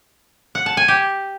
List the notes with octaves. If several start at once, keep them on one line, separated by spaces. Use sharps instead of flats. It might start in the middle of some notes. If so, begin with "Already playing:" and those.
F#5
A5
G#5
G4